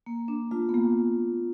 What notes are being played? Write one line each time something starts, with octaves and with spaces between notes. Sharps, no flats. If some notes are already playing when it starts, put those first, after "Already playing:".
A#3
D4
A3 D4 F4
B3
A#3